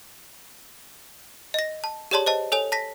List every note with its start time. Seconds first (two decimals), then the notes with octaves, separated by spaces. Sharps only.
1.54 D#5 A#6
1.84 A5
2.11 G4 G#4 C#5 D5 A5 C6
2.26 C5 D#5 A5
2.52 A4 C#5 G#5 F7
2.72 A5 A#6 B6